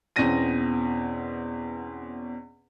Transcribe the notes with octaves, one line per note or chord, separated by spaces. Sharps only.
E2 B2 C4 C#4 A#6 D#7